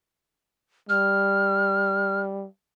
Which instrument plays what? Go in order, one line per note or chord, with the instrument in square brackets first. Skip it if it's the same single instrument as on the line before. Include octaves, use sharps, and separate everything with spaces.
[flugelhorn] G3 [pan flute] F6